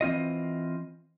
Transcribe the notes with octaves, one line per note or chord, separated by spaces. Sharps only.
E3 C4 F4 D#5